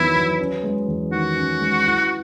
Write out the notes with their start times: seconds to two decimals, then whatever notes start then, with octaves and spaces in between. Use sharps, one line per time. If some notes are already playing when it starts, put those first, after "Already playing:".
Already playing: E2 D#3 F#3 B3 E4
0.15 F#3
0.39 C#4
0.63 G#3
0.88 E2
1.12 D#3 F#4
1.36 C#4
1.60 G#3
1.85 E4